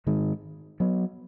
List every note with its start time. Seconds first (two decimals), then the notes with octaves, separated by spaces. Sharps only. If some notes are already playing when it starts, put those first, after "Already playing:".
0.07 G#2 D#3 G#3
0.80 F#3 B3